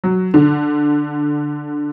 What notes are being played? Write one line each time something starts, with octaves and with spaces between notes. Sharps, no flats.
F#3
D3